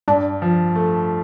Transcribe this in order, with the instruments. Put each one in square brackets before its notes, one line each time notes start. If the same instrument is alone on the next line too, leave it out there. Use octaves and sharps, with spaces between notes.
[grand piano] G2 [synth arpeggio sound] D4
[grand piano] F3
A3